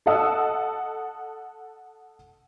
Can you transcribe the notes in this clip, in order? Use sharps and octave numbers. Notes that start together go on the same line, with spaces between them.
A4 D#5 F#5 A5 D#6 E6